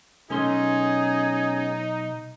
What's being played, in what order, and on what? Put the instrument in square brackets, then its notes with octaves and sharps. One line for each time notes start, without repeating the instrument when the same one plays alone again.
[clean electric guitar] B1 A4 C6 [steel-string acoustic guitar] C#4 [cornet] D#4 [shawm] G#4